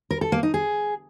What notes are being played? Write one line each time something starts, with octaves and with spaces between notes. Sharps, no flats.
A#4
A4
A#3
D#4
G#4